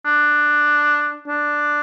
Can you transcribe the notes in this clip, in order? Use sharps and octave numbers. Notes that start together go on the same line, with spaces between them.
D4
D4